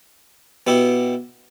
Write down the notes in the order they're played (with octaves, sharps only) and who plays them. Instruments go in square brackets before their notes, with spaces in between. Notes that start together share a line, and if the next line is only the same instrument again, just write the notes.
[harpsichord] B2 B3 E4 G4